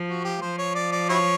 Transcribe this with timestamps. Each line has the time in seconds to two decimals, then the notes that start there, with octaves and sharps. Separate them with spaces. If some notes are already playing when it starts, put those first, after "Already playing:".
Already playing: F3
0.08 F#4
0.24 G4
0.41 F3 C5
0.58 C#5
0.75 D5
0.92 D5
1.09 E4 F#4 C#5